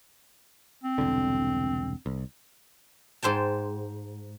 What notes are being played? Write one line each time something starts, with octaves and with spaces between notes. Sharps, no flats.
C4
E1 C2 D3
C2
G#2 C5 G5 A5